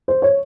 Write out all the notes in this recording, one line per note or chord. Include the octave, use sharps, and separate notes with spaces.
C5
C#5